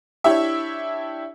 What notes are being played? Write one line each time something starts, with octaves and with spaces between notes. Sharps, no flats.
D4 E4 G4 C#5 E5